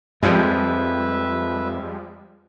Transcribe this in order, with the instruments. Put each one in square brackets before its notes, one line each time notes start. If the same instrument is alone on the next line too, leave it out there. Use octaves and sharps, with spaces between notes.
[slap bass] F2 [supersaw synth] F3 G3 G#3 [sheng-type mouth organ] B4 E5